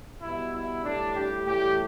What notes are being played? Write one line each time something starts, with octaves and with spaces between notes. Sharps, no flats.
B2 G3 E4
E4
A2 G3 D4
G4
A2 E3 G3 G4